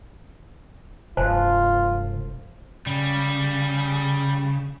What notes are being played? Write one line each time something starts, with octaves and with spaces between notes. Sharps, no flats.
E1 G2 C3 F3 F4 C5 G#5 A5
C#3 G3